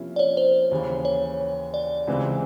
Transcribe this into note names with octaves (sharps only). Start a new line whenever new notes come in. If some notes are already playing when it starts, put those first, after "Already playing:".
Already playing: C3 F3 A#3 C#4 E4
D5
C#5
C5
D#2 C#3 E3
C#5
D5
C#2 C3 E3 G#3 C4